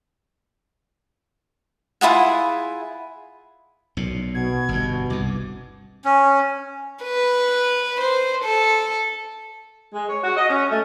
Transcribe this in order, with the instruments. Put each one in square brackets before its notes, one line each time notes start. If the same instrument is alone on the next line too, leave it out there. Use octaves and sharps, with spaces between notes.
[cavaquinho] E4 F4 G#4 F#5
[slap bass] B1 A#2
[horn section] B2 [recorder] G#6
[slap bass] G1 G2
[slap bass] C2 G2 [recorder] D6
[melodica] C#4
[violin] B4
C5
A4
[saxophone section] G#3
C#5
F#4
D#5
C#4
A3